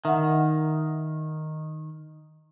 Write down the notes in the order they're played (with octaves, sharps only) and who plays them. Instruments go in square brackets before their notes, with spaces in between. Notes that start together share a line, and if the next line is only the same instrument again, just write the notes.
[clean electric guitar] D#3 [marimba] E5 F#5